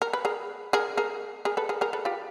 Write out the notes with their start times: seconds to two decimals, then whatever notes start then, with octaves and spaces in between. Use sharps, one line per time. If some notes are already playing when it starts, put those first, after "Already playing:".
0.02 A#4
0.13 B4
0.25 G#4 A#4
0.73 G#4 A#4
0.97 G#4 A#4
1.45 G#4 A#4
1.57 A4 B4
1.69 G#4 A#4
1.81 G#4 A#4
1.93 A4 B4
2.05 F4 G4